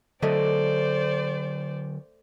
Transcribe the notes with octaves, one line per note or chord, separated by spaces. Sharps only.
D3 F#3 A3 C5 D5 D#5